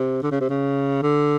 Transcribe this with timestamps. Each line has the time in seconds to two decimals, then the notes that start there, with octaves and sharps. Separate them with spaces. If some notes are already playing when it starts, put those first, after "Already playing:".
Already playing: C3
0.23 D3
0.32 C#3
0.40 C3
0.49 C#3
1.03 D3